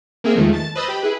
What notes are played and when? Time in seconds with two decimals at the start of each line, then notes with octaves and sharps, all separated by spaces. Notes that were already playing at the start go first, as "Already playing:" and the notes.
0.24 A#3 C4 G#4 A#4 E5 G#5
0.36 E2 D#3 F3 G#3 A3
0.53 A5 A6
0.75 B4 C5 D#5 D#6 E6 A6
0.88 G4 G5 B5
1.02 E4 G#4 B4